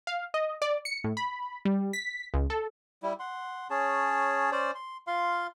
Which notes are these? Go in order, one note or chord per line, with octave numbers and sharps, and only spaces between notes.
F5
D#5
D5
C#7
A2
B5
G3
B6
C#2
A4
G3 E4
F#5 C6
C#4 G#4 C#5 A5
C#4 C5 D5
C6
F4 F5 C6